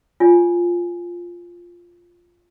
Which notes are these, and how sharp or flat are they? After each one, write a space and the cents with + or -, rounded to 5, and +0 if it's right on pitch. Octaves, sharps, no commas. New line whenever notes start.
F4 +0 C#5 +35 G#5 +0